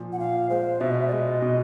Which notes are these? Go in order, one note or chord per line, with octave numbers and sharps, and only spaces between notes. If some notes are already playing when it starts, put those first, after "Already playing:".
Already playing: A#2 F3
F#5
A#2 F5
G#3 C5
B2 E5
D#5
E5
D5
G#3 D#5
B2